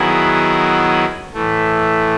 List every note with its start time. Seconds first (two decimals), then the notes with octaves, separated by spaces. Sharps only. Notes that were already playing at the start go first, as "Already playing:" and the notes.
Already playing: D#3 F#3 B3 E4 G#4
1.34 A2 E3 A3